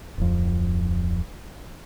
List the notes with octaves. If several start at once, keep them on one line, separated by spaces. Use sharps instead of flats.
D1 F2